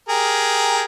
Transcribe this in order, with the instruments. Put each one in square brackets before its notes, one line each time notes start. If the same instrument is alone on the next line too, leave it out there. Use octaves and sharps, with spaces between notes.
[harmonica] G4 G#4 A#4